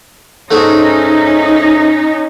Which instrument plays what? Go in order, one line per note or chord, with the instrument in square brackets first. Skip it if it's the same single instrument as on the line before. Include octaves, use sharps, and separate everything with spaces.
[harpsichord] G#2 A3 [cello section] C#4 D#4